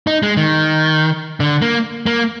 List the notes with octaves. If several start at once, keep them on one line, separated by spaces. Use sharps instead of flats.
D#4
G#3
D#3
D3
A#3
A#3